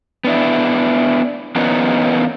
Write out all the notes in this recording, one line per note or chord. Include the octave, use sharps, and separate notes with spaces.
B3 D4 E4
E3 A#3 B3 C#4 D#4